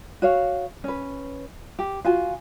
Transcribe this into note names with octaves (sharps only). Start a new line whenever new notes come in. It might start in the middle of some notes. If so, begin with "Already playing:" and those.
F#4 C#5 F5
C#4 B4
G4
F4 F#4 G#5